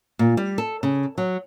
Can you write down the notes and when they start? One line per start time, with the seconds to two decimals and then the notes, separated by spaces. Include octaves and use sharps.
0.19 A#2
0.37 G3
0.58 A4
0.83 C#3
1.18 F#3